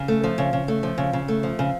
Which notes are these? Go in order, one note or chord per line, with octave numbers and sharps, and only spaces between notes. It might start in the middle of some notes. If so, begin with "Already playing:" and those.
Already playing: C#3
A3
F3
C#3
C#3
A3
F3
C#3
C#3
A3
F3
C#3